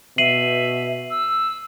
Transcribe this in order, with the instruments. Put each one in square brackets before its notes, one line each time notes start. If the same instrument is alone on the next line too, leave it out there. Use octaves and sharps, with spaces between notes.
[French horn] B2 [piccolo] E5 [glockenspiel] C7 D#7 F#7
[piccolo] E6